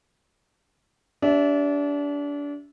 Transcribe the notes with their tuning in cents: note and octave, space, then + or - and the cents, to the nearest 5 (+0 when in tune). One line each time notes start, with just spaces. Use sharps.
D4 -30 G4 -15 E5 +0